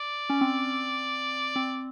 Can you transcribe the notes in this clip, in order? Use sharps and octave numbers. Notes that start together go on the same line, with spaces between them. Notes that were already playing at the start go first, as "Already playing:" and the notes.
Already playing: D5
C#4
C4
C4